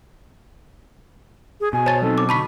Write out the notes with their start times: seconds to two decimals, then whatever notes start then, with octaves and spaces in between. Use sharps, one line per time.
1.61 G#4
1.73 B2 G#5
1.86 C5 C#5 A5 A6
2.02 F#3 C4 D#4 A4
2.18 D6
2.29 D3 A5 B5 C#6 B6